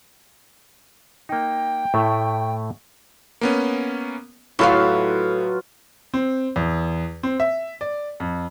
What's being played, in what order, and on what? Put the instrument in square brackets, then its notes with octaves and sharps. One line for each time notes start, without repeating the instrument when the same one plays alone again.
[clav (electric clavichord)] A#3 D#4 [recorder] G5
[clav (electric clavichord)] A2 A3 E4
[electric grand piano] A#3 B3 C#4
[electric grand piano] A2 [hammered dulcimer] F#3 F4 B4 [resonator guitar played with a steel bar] E4 A4 F5
[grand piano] C4
E2
C4
E5
D5
F2